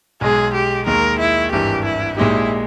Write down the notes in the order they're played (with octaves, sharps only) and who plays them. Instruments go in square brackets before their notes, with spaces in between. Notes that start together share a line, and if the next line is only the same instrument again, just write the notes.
[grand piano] B1 B2 G#3 [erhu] G#4
[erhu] G4
[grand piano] D#2 D#3 G#3 [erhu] A#4
[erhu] E4
[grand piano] G#1 G2 E3 [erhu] G4
[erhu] E4
[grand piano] A#1 A#2 G#3 D#4 G4 [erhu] E4